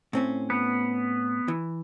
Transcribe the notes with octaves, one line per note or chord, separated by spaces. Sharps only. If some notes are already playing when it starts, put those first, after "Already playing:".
A2 C4 C#4
B3
E3